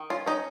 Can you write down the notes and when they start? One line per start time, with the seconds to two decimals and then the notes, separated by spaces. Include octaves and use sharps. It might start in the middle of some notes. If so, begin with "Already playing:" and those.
Already playing: D#3
0.10 C#4 F4
0.26 C#4 D#4